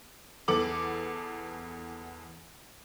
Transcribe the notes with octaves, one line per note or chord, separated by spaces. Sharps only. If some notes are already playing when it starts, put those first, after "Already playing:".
E2 B3 A4 D6 F#7